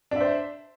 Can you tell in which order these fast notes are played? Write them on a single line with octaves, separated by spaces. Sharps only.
D4 E5 C5